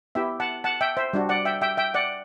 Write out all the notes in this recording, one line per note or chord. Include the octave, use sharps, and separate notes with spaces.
B3 E4 G4 E5 G5
F#5 A5
F#5 A5
E5 G5
C5 E5
G3 D4 F#4
D5 F#5
E5 G5
E5 G5
E5 G5
D5 F#5